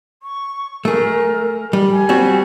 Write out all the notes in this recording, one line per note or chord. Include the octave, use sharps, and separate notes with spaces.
C#6
A3 G#4 A#4
G3
G#5
G3 C4 F#4